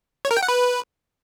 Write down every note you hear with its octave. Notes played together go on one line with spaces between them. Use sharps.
C#5
A#4
G5
F#5
B4